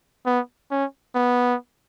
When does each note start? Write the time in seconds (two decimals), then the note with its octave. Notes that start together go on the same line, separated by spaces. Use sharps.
0.26 B3
0.71 C#4
1.15 B3